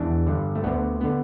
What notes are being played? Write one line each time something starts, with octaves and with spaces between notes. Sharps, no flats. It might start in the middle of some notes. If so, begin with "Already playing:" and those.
Already playing: E2 E3 D4
G2 D3
A3
D2 D3 B3
D3 B3